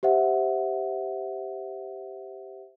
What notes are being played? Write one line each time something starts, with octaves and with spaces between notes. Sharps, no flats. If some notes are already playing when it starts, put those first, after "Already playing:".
G4 C5 E5 F#5